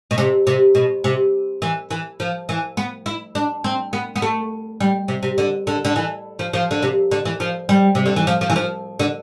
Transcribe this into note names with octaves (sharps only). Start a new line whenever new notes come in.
B2
C3
C3
B2
C3
E3
E3
F3
E3
B3
E4
D4
C4
B3
B3
A3
G3
C3
C3
D3
D3
D3
E3
F3
F3
D3
C3
D3
E3
F3
G3
C3
D3
E3
F3
F3
E3
F3
D3